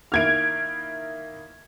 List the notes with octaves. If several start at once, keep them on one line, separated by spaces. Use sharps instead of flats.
D#3 A#3 E4 F6 G#6 D7